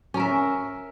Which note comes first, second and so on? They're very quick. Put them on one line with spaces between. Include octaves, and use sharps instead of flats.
C#4 A#4 E5